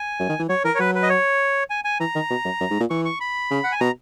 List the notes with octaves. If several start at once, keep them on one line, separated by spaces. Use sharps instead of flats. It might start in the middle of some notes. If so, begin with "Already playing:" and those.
Already playing: G#5
F#2
D#3
E3
F#3 C#5
E3 A#4
C#5
F#3 B4
B4
D#5
C#5
G#5
G#5
E3 A#5
D#3
B2
F#2
F#2
G#2
A#2
E3 C#6
C#6
B5
C#3
F#5
G#5
B2 A#5